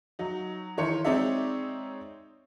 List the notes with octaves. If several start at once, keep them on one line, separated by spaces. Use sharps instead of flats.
F#3 D#4
D#3 E3 C#5 C6 C#7
G#3 C4 D#4 C#5 D5 E5